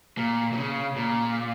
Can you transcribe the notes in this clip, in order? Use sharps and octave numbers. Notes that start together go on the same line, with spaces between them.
A#2
A#2
C#3
A#2